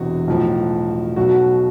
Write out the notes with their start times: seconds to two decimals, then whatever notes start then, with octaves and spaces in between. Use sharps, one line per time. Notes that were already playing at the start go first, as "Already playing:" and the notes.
Already playing: E1 E2 C3 F#4
0.27 B1 A2 F3
1.16 B1 B2 F#3 F#4